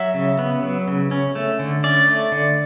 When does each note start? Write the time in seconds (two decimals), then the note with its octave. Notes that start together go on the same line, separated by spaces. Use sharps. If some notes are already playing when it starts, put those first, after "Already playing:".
Already playing: F#3 E5
0.14 C#3
0.39 B3
0.63 F#3
0.88 C#3
1.11 C#4
1.35 A3
1.59 D3
1.84 C#4 D5
2.08 A3
2.32 D3